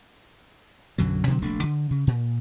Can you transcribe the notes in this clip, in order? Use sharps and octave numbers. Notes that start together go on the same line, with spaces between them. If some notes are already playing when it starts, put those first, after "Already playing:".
B1 F#2 D3 F#3
B2 D3 D#3 F#3
F1 A#1 A3 D4
D3
C#3
A#2